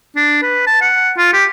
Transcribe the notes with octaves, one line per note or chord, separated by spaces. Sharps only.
D4
B4
A5
F#5
F4
G4